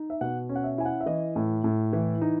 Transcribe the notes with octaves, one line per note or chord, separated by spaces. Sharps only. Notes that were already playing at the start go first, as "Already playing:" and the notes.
Already playing: D#4
E5
B2 F#5
C#4
F#5
E5
E4 G#5
F#5
E5
E3 D#5
A2
A2
E3
D#4